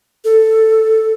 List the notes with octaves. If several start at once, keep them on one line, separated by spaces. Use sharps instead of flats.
A4